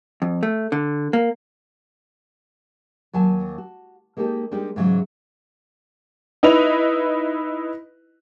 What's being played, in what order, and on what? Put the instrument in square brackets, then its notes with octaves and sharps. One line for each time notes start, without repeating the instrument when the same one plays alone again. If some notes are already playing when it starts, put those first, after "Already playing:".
[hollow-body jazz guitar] F2
A3
D3
A#3
[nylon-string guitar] D#2 F#3 G#5 A5
F#4
G#3 A#3 D#4 G4 A4
G3 G#3 D4 D#4 G4
G#2 C#3 E3 F#3 G#3
[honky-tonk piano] D#4 E4 B4 D#5 F7